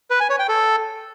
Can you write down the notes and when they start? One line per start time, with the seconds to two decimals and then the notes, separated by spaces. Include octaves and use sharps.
0.11 B4
0.20 G#5
0.30 C#5
0.39 G5
0.49 A4